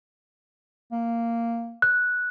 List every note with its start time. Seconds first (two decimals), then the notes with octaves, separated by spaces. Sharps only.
0.92 A#3
1.82 F#6